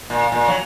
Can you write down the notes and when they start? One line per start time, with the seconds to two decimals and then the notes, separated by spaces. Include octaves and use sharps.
0.10 A#2
0.32 A#2
0.48 F#3